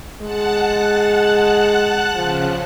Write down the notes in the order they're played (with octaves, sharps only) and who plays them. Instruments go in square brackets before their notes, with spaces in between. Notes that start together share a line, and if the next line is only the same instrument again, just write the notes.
[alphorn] G#3 [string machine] F#5 A5 F#6
[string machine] C#3 [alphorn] F3